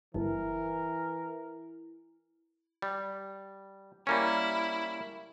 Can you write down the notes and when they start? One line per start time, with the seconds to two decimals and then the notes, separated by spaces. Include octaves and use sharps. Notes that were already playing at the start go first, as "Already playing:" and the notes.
0.14 G1 E3 E4 A#4
2.82 G3
4.07 G3 A#3 C#4 E4